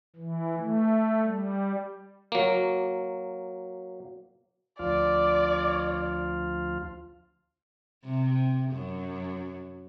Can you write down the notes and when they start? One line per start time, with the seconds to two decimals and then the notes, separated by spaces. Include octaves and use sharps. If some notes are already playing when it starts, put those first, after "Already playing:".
0.16 E3
0.57 A3
1.24 G3
2.32 F#3 A#3
4.79 D2 F3 F4 D5
8.04 C3
8.71 F#2